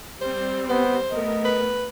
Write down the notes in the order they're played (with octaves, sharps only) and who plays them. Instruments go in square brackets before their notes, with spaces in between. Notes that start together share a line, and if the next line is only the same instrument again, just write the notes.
[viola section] G3 C4 [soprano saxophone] C5
[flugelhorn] B3 [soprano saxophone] C5
[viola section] A3 B3 A#4 [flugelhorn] D#5
[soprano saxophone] B4